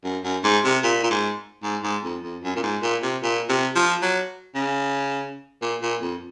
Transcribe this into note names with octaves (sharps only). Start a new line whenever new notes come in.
F#2
F#2
G#2
C3
A#2
A#2
G#2
G#2
G#2
F2
F2
F#2
A#2
G#2
A#2
C3
A#2
C3
F3
F#3
C#3
A#2
A#2
F2